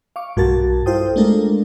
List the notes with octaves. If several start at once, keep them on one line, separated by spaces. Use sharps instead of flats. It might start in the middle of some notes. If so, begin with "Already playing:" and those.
F5 C#6 D6
B1 G2 F#4 A#4 A5 A6
E4 F4 A4 C5 G5 D#6
G#3 A3 D4 F4 A4 A#4